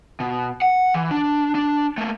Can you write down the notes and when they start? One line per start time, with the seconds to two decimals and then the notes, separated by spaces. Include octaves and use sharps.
0.20 B2
0.62 F#5
0.94 E3
1.11 D4
1.55 D4
1.98 A3 A#3